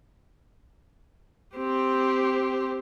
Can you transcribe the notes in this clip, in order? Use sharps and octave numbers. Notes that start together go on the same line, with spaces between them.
C4 G4